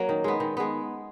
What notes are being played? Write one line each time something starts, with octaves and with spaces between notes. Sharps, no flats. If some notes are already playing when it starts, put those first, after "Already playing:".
Already playing: F#3 A#3 C#4 C#5
D#3
G#3 B3
D#3
G#3 B3